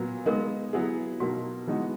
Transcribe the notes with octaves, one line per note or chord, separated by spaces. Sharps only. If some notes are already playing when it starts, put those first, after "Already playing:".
Already playing: A#2 F#3 B3
G#3 B3 D#4 A#4
F#3 B3 E4 G#4
B2 F#3 A#3 D#4 F#4
E3 G#3 B3 D#4 F#4